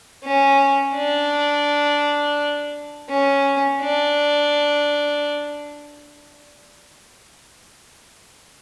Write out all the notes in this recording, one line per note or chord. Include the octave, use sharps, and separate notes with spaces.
C#4
D4
C#4
D4